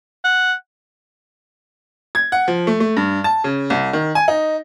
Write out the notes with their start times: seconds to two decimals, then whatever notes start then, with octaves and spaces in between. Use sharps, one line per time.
0.24 F#5
2.15 G#6
2.32 F#5
2.48 F3
2.67 A3
2.80 A3
2.97 G2
3.24 A5
3.44 C#3
3.70 C2
3.93 D#3
4.15 G#5
4.28 D#4